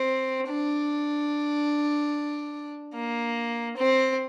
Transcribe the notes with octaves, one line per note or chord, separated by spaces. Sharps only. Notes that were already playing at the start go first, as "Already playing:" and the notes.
Already playing: C4
D4
A#3
C4